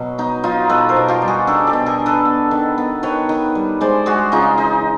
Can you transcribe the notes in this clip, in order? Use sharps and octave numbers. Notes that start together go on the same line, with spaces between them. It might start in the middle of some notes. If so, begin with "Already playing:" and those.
Already playing: B2 F#3
B3 D#4
F#3 D#4 F4
B2 A4 B4
A#4 C5
B2
F4 G4
G3
F#4 G#4
D4 G4 A4
G4 A4
B2
G#4 A#4
D4
A4 B4
B3
D#3
B3
D#3 B4 C#5
D#3
G3
G#3 C5 D5
G#3 F#4 G#4
C#3 D#4 F4
E3 D#4